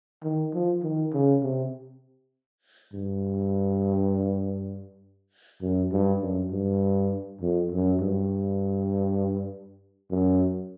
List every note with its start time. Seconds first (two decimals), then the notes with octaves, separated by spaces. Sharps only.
0.23 D#3
0.54 F3
0.83 D#3
1.13 C#3
1.43 C3
2.93 G2
5.61 F#2
5.92 G2
6.21 F#2
6.51 G2
7.41 F2
7.72 F#2
8.00 G2
10.11 F#2